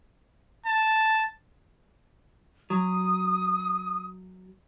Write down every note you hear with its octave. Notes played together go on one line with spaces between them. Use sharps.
A5
F#3 D#6